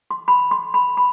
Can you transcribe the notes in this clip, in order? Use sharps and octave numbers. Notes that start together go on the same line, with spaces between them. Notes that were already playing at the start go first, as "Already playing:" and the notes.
C6
B5
C6
B5
B5